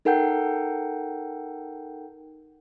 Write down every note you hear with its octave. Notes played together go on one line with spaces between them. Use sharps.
D#4 A4 A#4 F#5 G5 G6